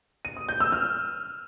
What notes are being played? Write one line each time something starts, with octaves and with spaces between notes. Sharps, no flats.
D#7
D#6
G6
E6
F6